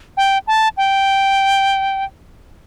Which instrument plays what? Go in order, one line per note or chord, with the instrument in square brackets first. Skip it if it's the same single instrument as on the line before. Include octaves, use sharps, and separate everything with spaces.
[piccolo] G5
A5
G5